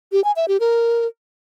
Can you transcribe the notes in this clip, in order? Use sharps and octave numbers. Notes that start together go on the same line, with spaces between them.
G4
G#5
E5
G4
A#4